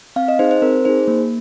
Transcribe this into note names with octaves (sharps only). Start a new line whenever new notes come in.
C4 F5
D#5
D#4 G#4 C5
C5
C4 A#4
D#4 G#4 C5
A#3